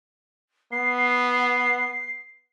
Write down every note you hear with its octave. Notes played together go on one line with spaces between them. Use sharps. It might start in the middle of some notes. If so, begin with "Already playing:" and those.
B3 C7